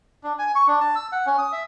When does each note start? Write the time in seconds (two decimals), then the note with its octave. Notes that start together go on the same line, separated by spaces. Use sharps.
0.24 D4
0.39 G#5
0.55 C#6
0.68 D4
0.80 A5
0.96 E6
1.12 F#5
1.26 C#4
1.38 D#6
1.52 E5